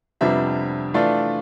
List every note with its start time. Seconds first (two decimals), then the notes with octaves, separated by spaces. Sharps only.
0.21 F2 C3 G3 B3 D4 E5
0.94 E3 A3 D4 F4 D5